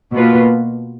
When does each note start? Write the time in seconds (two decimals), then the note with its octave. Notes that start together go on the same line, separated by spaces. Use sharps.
0.14 B2 A#3 F4 B4